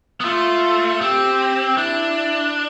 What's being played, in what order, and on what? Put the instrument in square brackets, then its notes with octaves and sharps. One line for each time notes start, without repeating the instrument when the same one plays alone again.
[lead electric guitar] B3
[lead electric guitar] A3 [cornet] F4
[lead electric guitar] C4 [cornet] G4
[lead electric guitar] D4 [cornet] E4